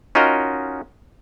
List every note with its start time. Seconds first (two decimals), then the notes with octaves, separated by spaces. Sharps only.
0.15 C#4 D#4 F4 F#4 A#4 D#5